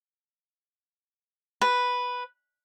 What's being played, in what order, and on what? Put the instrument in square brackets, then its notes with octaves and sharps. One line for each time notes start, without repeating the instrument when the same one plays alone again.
[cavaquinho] B4